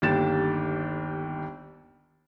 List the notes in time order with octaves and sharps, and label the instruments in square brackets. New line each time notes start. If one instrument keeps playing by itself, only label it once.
[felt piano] G1 D#2 D3 G4 A6 E7